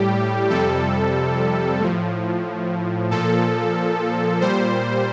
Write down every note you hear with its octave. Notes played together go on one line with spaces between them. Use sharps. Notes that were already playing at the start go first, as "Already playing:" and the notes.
Already playing: A2 G3 G4
F2 C3 G3 A4
A2 F3
A#2 F3 A4
A#2 G3 C5